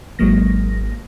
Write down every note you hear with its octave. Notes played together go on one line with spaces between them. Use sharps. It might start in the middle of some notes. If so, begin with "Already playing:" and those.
G#1 F#3 G#3 A#3 A#6